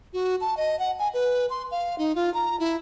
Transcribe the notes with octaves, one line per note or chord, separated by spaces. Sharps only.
F#4
A5
D#5
F#5
G#5
B4
C6
F5
D#4
F4
A#5
E4